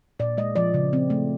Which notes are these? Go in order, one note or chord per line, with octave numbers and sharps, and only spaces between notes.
A#2 D5
G#3 D#5
F3 D5
C#3
C4
A3